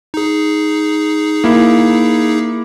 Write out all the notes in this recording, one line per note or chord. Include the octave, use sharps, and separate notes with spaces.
D#4 G#4
A#3 E4